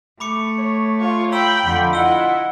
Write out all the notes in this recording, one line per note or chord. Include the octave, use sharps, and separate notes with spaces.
A3 B5 D6 C#7
C#5
F4 C#5
G5 A#5 B5 E6 F#7
F2 D3 F4
E4 D#5 F#5 E6 G7